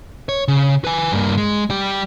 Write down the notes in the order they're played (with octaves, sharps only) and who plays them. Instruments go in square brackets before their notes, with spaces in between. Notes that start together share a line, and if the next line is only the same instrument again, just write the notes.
[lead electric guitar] C#5
C#3
B4 G#5
G2 A#3
G#3
G3 G4